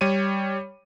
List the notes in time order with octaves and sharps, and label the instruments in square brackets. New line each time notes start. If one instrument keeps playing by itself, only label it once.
[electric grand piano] G3 C#5 D#7